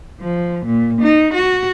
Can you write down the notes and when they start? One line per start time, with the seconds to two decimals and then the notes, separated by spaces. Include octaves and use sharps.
0.21 F3
0.66 A#2
1.02 D#4
1.34 F#4